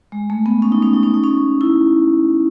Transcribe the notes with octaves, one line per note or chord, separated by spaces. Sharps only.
G#3
A3
B3
C#4
D#4
C#4
D#4
C#4
D#4
C#4
E4